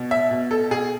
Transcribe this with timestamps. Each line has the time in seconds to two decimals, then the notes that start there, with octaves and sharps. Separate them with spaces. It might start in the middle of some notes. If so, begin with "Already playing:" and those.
Already playing: B2
0.11 E5
0.31 B2
0.51 A4
0.71 B2 G#4